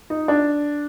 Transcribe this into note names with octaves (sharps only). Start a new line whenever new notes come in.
D#4
D4